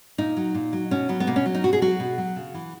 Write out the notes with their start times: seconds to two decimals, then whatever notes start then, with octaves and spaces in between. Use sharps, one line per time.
0.18 A#2 D#4
0.37 F#3
0.54 A#2
0.73 F#3
0.91 B2 C#4
1.09 F#3 B3
1.20 B3
1.27 B2 A#3
1.36 C#4
1.46 F#3
1.55 D#4
1.64 B2 F#4
1.73 G#4
1.81 F#3 F#4
2.00 B2
2.18 F#3
2.36 C#3
2.54 E3